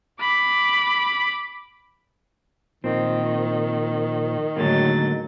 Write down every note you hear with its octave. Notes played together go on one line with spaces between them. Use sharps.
B5 D6
A#2 D#3 F3 C4
A2 D3 F#3 G#3 A#3 D#4 A6